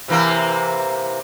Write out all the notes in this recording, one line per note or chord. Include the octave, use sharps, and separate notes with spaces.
C3 E3 A#3